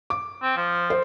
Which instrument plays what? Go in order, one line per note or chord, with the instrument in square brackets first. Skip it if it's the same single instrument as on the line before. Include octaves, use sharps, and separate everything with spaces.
[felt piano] D6
[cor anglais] C4
F3
[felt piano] C5